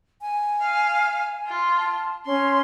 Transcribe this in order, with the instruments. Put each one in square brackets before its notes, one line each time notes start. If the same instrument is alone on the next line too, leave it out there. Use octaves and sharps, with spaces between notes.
[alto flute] G#5
[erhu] F5
F4
[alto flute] A5
[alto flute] C#4 [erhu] C6